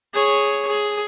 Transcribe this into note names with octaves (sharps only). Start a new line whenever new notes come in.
G#4 C#5
G#4